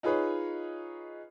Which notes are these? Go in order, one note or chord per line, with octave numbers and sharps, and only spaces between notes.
D#4 F4 G#4 B4 C#5